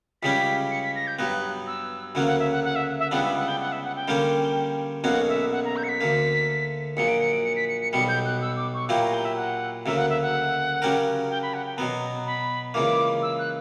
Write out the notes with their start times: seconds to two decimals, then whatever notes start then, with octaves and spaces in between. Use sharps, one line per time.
0.22 C#2 C#3 G3 C#4 G4 B6
0.71 C#7
0.83 B6
0.95 A#6
1.07 G6
1.18 G2 F#3 B3 F#6
1.67 E6
2.15 D2 C#3 F#3 A#3 C#4 F#5
2.27 F#5
2.39 E5
2.52 F#5
2.64 F#5
2.76 E5
2.99 E5
3.11 C#2 C#3 G3 B3 D4 F#5
3.24 E5
3.36 F#5
3.48 G5
3.60 F#5
3.72 E5
3.84 F#5
3.96 G5
4.08 D3 G3 A#3 C#4 G4
5.04 B1 B2 A#3 C#4 F#4 F#5
5.29 E5
5.52 F#5
5.65 A#5
5.76 G6
5.83 C#7
5.89 B6
6.01 D2 D3 A#3
6.97 A#1 A#2 F#3 C#7
7.08 D7
7.20 C#7
7.32 D7
7.44 C#7
7.56 B6
7.68 C#7
7.81 C#7
7.92 B1 B2 G3 C#7
8.08 G6
8.25 F#6
8.41 E6
8.57 D6
8.74 C#6
8.89 A#2 F#3 A#3 E4 G4
9.01 A#5
9.13 G5
9.25 E5
9.37 F#5
9.86 D2 C#3 F#3 A#3 E5
9.98 F#5
10.10 E5
10.22 F#5
10.82 C#3 F#3 C#4 G4 A#4
11.30 G5
11.42 B5
11.54 F#5
11.66 G5
11.77 B2 F#3 B3 A#5
12.26 B5
12.74 C#2 C#3 E3 A#3 D6
13.22 E6
13.39 F#6